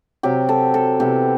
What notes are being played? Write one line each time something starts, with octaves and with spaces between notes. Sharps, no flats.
C3 F#3 C4 G4
A4
A4
C3 E3 B3 G4